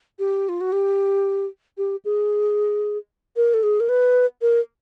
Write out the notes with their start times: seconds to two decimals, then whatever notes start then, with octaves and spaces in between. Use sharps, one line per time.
0.19 G4
0.49 F4
0.61 F#4
0.72 G4
1.78 G4
2.05 G#4
3.36 A#4
3.54 A4
3.63 G#4
3.80 A#4
3.89 B4
4.42 A#4